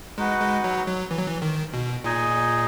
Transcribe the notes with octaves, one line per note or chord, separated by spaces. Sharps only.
G#3 D#4 F#4 B4 F#5
G#3
F#3
F#3
E3
F#3
E3
D#3
B2
A#2 D#4 G#4 D#5 G#5